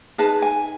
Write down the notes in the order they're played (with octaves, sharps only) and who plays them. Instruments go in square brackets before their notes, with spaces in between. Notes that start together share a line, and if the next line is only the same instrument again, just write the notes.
[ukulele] D#4 G#4 B4 A5
G#5